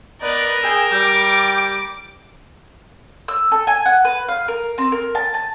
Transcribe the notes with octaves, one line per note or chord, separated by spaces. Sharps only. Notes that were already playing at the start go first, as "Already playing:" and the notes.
B3 D#4 A#4 B4 D5
G#4 G5 E6
G3 G5 D6
E6
A4
G#5
F#5
B4
F5
A#4
C4
A#4
A5
A5